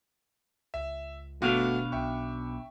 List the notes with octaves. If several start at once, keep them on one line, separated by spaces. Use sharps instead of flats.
C#2 E5
G1 B2 A3 B3 D4 F#4 F5
B1 E5 G5 C#6